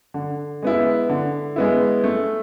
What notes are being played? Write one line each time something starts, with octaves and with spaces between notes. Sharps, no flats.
D3
G#3 B3 E4
D3
G#3 B3 E4
A3